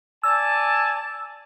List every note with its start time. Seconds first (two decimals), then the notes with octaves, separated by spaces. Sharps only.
0.23 D5 G#5 A5 E6